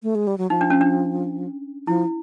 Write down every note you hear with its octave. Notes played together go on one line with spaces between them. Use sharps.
A3
G#3
G3
F#3
F3 D#4
D4
C#4
D4
F3 E4